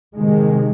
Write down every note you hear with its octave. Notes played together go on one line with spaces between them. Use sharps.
C3 D#3 G#3